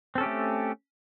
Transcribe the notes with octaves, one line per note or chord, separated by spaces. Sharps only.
A3 C4 C#4 G4 A4